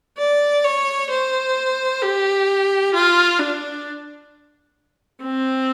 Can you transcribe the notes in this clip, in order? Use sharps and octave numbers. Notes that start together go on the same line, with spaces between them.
D5
C#5
C5
G4
F4
D4
C4